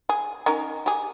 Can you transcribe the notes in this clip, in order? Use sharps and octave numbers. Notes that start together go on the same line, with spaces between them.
G#4
C#4 D#4 A#4
G4 G#4